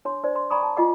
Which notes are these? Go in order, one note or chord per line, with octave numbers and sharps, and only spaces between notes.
D4 C#5 C6
D4 C5 D5
C6
D5 G#5 A#5 B5 C#6 D#6
A5
F4 D#5 F#5 D6